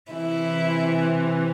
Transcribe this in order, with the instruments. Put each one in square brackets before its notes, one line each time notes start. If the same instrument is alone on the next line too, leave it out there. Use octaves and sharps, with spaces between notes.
[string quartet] C3 E3 E4